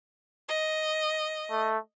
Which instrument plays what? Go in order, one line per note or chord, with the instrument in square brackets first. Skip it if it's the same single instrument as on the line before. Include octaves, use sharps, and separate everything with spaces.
[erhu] D#5
[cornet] A3